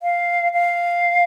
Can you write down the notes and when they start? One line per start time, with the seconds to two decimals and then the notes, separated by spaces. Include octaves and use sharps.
0.03 F5
0.54 F5